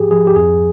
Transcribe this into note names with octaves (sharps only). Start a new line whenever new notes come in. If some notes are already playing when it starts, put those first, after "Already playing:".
Already playing: G#2 F3 G4 G#4
F3 G#4
G4
F2 G#4